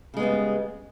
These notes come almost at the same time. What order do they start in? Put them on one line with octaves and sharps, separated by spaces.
C#3 G#3 B3 G3